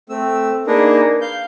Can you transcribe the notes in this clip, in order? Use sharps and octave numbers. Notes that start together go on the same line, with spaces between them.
A3 C4 E6
A#3 D4 D#4 G#4 A#4 B4
F5 G6